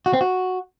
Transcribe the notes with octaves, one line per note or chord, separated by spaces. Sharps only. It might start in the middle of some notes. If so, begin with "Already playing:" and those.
F#4
C4
F#4